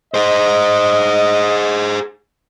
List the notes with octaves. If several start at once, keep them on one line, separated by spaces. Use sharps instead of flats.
G#4 C5 D#5